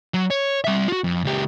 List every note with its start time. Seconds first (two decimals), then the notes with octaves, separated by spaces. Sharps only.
0.14 F#3
0.30 C#5
0.64 G3 E5
0.88 F4 F#4
1.04 F2
1.25 C#2 G4